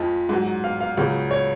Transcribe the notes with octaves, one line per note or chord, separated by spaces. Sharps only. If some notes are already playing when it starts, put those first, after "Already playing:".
Already playing: F2 F3 G#3
G#2 F#3
F5
F5
C#2 C#3 F#3
C#5